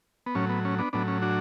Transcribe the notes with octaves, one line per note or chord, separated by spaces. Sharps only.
B3
A2 F#3 C#4
B3
C#4
B3 D4
A2 F#3 B3 D4
C#4
D4 F#4